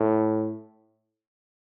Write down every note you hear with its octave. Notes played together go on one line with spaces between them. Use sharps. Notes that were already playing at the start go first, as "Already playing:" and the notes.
Already playing: A2